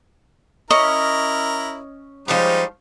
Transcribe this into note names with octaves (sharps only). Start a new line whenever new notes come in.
C#4 E4 A#4 D#5
F3 G3 G#3 D#4 C5 C#5